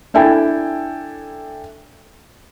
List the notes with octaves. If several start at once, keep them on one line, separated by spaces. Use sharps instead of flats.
D4 E4 A4 G5 G#5